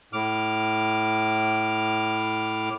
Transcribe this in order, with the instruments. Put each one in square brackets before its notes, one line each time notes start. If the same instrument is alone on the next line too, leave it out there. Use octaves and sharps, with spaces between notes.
[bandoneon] A2 D6 F6